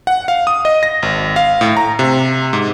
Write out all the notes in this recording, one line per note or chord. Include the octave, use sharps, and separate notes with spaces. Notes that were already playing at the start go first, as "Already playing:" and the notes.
F#5
F5
D#6
D#5
A#6
G#1
F5
A2
A#5
C3
G#2